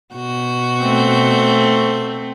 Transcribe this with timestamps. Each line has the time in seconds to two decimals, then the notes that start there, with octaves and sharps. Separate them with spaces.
0.13 B2 F#4 G6
0.83 A3 C4